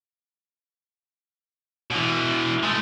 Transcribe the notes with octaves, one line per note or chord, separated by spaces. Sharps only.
B2 E3
G#3 A3